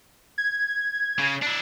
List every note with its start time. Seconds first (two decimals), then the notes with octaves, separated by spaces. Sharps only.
0.38 G#6
1.19 C#3
1.42 D4 E4